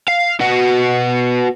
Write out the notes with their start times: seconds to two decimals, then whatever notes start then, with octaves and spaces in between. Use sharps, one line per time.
0.08 F5
0.40 B3 F#4